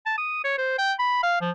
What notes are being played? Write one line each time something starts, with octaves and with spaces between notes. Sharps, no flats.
A5
D#6
C#5
C5
G5
B5
F5
F3